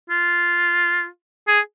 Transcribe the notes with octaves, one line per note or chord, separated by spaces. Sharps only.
F4
G#4